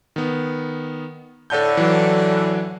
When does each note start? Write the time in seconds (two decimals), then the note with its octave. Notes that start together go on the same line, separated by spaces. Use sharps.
0.16 D#3 B3
1.50 A2 D3 A4 G6
1.77 E3 F#3